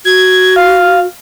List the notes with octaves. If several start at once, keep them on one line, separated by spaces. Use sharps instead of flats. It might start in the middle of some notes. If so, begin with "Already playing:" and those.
F#4 G#6
F5